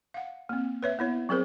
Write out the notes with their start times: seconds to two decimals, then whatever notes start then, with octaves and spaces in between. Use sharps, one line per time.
0.14 F5 F#5
0.49 A#3 C4
0.83 B4 C#5 E5
0.99 B3 E4 C#5
1.29 F#3 C4 G#4 A#4 C5